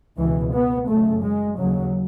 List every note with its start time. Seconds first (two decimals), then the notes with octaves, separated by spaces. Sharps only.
0.18 C#2 B2 E3
0.53 B3
0.88 F#2 C#3 A3
1.24 G#3
1.58 D#2 C#3 F#3